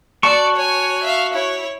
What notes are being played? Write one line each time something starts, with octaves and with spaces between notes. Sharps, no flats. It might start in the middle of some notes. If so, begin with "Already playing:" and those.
F#4 D5 A5 C#6
C#5 G#5
E5 F5
E4 C#5